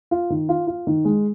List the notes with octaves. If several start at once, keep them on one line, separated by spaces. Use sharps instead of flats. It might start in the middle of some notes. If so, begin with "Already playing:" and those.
F4
D#3
F4
F4
D#3
G#3